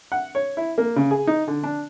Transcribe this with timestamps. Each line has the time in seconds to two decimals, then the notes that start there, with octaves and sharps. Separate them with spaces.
0.12 F#5
0.35 C#5
0.57 E4
0.78 A#3
0.96 C#3
1.11 G#4
1.27 D#4
1.48 D3
1.64 D4